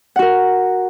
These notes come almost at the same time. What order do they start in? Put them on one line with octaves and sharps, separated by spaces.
F#5 F#4 A#4